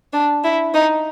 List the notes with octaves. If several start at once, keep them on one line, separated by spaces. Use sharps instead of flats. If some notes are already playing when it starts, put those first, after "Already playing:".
D4
E4
D#4